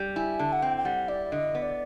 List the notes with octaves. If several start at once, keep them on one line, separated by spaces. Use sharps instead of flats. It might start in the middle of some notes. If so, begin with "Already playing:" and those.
Already playing: G3
E4 G#5
D3 A5
F#5
C4 G5
G5
G3 F#5
E4 D5
D3 D#5
B3
D5